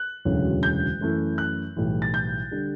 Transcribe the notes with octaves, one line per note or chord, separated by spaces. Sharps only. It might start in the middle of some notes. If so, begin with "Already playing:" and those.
Already playing: F#6
E1 D2 C#3 F#3
G6
F#2 E3 A3
F#6
B1 A2 E3 G3
A6
G6
D3 G3